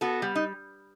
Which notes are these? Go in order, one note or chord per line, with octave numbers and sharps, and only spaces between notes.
B3 F#4 A4
G3
D#4